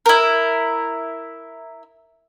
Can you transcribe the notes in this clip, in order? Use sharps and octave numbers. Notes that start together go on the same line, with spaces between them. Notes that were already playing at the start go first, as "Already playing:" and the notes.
E4 A#4